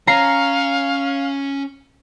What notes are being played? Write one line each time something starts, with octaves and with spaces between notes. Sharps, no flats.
C#4 F5 A#5 C7